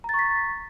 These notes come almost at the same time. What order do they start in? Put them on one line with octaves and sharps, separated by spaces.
A#5 A6 C#6 B6